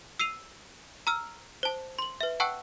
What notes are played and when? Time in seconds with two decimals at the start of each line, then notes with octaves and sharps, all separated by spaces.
0.20 E6 C7 D#7 F7
1.07 A#5 E6 F6
1.63 C5 A5
1.99 C6 F#7
2.21 B4 E5
2.40 F#5 G5 A5 C#6 E6 F#6